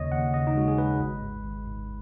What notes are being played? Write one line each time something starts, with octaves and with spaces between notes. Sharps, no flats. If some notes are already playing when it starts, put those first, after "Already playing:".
Already playing: D#2 C#3 C#5 D#5
D#2 F#5
C#3 D#5
D#4
G#3 F#4
G#4
G#3 B4
G#1
G#2
G#1
G#2